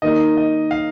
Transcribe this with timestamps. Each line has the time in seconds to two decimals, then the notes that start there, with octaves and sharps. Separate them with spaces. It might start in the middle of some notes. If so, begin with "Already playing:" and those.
0.02 D#3 A#3 D#4 D#5
0.37 D#5
0.71 F5